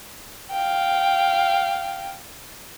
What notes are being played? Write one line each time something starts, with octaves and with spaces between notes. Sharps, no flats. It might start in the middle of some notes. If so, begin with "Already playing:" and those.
F5 G5